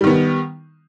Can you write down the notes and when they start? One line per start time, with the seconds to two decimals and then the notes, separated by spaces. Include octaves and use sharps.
0.01 G3
0.04 D#3
0.07 B3